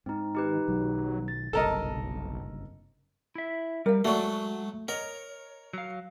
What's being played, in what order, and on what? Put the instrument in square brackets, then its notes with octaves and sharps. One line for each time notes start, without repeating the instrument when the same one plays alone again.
[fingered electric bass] G#2 [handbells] C4 D#4
[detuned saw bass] D#3 [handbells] D#4 G4 B4
[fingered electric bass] B1 D#3 [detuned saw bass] F#3
[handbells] A6
[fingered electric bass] F#1 G2 C3 [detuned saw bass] B1 [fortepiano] A4 A#4 D#5 [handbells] A5
[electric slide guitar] E4 E5
[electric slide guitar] G3 [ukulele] A#4 F5
[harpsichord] F#3 A3 [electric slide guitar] G#3 [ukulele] F#4 D5
[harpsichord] A#4 [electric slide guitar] C#5 [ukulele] D#5
[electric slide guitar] F#3 F5